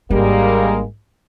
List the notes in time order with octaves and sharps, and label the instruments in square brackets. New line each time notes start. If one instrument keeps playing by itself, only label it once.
[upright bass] G#1 D4 [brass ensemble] G3 G#3 A#3